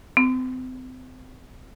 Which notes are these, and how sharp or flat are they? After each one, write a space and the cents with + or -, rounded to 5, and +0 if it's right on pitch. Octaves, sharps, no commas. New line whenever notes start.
C4 -40